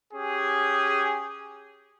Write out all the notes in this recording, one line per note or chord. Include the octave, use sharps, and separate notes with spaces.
C#4 G4 G#4